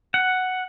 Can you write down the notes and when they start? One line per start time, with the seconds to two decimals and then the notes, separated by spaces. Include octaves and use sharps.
0.14 F#5